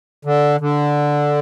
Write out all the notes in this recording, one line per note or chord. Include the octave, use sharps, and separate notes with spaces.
D3
D3